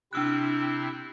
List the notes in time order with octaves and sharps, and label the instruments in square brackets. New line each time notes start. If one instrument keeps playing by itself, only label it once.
[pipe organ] C3 C4 E4 [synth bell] D4 E6 F#6